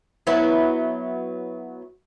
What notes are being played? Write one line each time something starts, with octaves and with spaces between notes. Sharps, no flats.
F#3 B3 E4